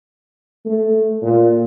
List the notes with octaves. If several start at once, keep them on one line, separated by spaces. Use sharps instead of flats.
A3
A#2